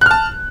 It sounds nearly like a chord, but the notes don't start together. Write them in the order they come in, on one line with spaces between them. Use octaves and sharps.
F#6 F6 A5